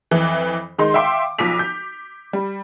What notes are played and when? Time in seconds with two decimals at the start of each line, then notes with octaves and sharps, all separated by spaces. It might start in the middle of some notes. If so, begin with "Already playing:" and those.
0.11 F2 E3
0.78 D#3 G#3 D#4 C6
0.94 E5 F5 G5 C6 D6
1.38 B1 F3 D6 B6 F7
1.59 G6
2.33 G3